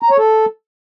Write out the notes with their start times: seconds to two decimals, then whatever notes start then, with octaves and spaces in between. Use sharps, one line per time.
0.02 A#5
0.10 C#5
0.18 A4